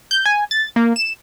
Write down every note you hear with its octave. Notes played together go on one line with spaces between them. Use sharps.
G6
G#5
A6
A#3
E7